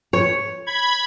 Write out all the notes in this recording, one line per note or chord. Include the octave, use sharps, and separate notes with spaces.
C#5
B5 G#6